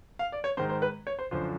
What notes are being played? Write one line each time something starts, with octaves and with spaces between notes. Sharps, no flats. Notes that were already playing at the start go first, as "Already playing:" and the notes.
F5
D5
C#5
G#2 D#3 C5
C5
B4
C#5
C5
F#2 D3 F3 C5